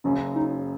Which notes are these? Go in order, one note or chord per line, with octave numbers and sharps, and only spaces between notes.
F#1 F#2 C#3 C#4
D#4